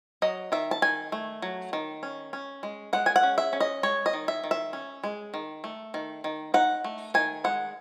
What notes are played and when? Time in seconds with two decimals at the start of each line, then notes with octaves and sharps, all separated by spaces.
0.22 F#3 D#5
0.52 D#3 E5
0.71 A5
0.82 D#3 G#5
1.12 A3
1.42 F#3
1.73 D#3
2.03 C#4
2.33 C#4
2.63 G#3
2.93 G#3 F#5
3.06 G#5
3.16 F#5
3.23 C#4
3.38 E5
3.53 C#4
3.60 D#5
3.83 G#3 C#5
4.06 D#5
4.13 D#3
4.28 E5
4.44 D#3
4.51 E5
4.73 C#4
5.04 G#3
5.34 D#3
5.64 A3
5.94 D#3
6.24 D#3
6.54 D#4 F#5
6.84 A3
7.14 D#3 G#5
7.44 G#3 F#5